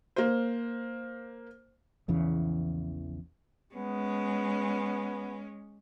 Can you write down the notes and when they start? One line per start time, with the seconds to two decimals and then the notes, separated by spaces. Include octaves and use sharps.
0.16 A#3 C5
2.08 A#1 E2 C#3 E3
3.74 G#3 B3 C#4